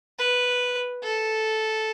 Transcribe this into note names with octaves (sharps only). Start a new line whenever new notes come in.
B4
A4